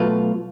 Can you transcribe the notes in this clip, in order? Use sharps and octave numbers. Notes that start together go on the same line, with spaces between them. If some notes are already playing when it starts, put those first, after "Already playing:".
Already playing: B2 F#3 A3 F4 B4